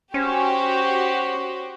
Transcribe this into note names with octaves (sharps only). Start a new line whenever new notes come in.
C#4 F#4 G4 C5 C#6